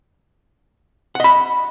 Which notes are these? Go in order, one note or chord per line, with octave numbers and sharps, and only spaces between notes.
D#5 F#5 B5